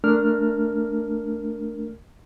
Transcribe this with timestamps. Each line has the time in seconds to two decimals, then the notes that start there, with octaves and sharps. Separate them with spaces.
0.04 A3 D4 A#4 F6